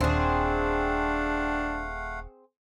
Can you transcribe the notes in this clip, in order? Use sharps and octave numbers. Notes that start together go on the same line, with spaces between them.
D#1 A3 C4 D4 G#4 F5 F#5